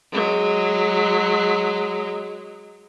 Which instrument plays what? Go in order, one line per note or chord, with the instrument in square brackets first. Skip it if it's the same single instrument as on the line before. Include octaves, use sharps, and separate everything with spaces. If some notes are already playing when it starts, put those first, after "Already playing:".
[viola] F#3 G#3